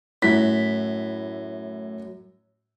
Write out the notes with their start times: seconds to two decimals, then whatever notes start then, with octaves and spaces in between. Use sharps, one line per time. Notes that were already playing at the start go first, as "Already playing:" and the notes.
0.22 F#2 A2 E4 B6